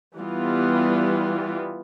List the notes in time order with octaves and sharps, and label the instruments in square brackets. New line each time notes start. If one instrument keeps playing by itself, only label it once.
[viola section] E3 G3 B3 F4